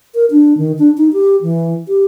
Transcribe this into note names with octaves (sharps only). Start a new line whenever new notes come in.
A#4
D4
D#3
D4
D#4
G4
E3
G4